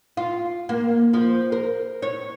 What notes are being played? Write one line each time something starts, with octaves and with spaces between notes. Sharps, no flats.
F4
A#3
F3
A#4
C#5